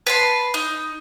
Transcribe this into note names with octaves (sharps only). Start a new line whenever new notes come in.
B4 A5 C6
D#4